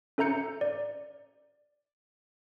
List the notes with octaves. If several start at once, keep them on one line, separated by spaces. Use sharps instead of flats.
C#4 A4 E5 A#5 G6 C#7
D5